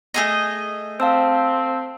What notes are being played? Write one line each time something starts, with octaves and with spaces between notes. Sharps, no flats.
A3 G#4 D#5
C4 F5 A5 E6